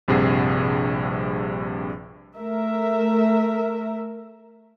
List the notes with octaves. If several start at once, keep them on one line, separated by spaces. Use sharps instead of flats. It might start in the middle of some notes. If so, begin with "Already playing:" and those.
A#1 G2 C3 G#4 F#5 C7
A3 A#4 E5